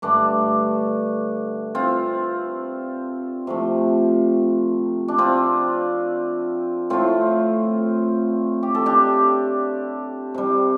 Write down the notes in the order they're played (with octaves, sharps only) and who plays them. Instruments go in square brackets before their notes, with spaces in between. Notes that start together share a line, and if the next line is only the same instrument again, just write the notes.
[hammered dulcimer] G2 D3 A3 D4
C4 F4
C3 F3 A3
D4
C4 F4
A2 A3 C4 F4
G4
A4
D4 G4
C3 G3